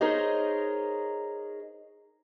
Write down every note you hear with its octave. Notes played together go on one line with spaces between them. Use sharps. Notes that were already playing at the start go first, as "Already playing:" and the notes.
D#4 G#4 A#4 C5 C#5 D#5